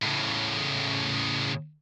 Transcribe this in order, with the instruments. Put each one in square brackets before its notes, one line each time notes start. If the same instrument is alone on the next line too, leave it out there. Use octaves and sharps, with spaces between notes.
[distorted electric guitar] A2 C#3